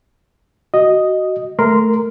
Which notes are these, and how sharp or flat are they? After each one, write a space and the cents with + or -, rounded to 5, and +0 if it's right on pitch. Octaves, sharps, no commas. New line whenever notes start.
F#4 +15 D#5 +0
A3 +0 A#4 +0 C6 -15